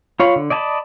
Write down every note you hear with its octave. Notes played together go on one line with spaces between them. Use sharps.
F4 C#5 F5 B5
D3
D5 D#5 G#5 A5 B5